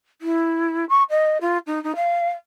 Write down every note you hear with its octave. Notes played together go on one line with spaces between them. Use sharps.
E4
C#6
D#5
F4
D#4
D#4
F5